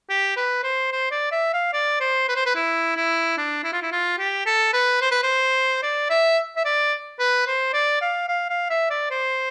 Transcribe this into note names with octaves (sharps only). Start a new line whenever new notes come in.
G4
B4
C5
C5
D5
E5
F5
D5
C5
B4
C5
B4
E4
E4
D4
E4
F4
E4
F4
G4
A4
B4
C5
B4
C5
D5
E5
E5
D5
B4
C5
D5
F5
F5
F5
E5
D5
C5